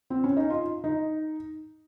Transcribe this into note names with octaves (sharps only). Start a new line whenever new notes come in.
C4
C#4
D#4
F4
D#4